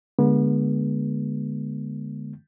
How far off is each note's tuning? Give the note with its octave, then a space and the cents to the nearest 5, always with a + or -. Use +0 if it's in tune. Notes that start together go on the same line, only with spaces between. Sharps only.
D3 +0 G#3 +0 B3 -35